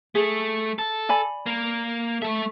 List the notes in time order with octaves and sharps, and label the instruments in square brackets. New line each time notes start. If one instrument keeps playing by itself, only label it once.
[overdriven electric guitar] A3 [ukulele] G#4
[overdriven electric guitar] A4
[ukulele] D5 G#5 B5
[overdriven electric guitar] A#3
[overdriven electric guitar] A3 E5 [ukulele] A4